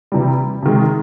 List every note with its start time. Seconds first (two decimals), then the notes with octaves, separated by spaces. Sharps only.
0.12 C3 E3 G3
0.63 C3 D#3 G#3